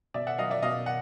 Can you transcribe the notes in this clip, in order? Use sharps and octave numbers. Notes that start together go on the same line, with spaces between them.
B2 D5 E5
E5 F#5
F#3 D#5 F5
D5 E5
B2 D#5 F5
F#5